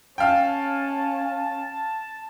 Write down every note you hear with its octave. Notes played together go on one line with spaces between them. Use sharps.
C#4 F5 G5 A5